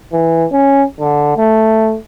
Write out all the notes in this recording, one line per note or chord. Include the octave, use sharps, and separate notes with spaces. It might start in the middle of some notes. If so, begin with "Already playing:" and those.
E3
C#4
D3
A3